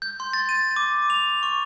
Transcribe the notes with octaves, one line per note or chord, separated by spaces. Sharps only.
G6
C6
A6
D#7
D6
F7
C#6